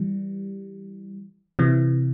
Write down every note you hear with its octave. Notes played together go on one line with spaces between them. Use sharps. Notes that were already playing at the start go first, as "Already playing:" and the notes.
Already playing: E3 G3
C3 E3